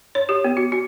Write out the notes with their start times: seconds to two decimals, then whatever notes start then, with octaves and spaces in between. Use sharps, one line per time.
0.15 C#5
0.29 G4
0.44 B3
0.57 F#4
0.72 F#4